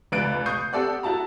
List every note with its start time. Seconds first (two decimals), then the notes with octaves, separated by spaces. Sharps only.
0.12 F1 C#2 B4 F#6 A6 D7
0.46 C#6 D#6 G6 C7
0.73 C4 G4 A4 D5 F#5
1.03 E4 F#4 A5 A#5